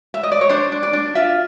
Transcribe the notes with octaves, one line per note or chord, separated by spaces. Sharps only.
E5
D#5
D5
C#5
D4 C5
D4
D5
D4
F4 E5